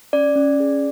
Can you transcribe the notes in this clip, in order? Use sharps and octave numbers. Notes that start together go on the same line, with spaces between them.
C#4 D5
C#4
G#4